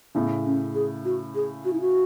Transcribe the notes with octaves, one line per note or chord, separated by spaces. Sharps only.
A2 C#3 B3
C#4
G#4
F#4
G#4
F#4
E4
F#4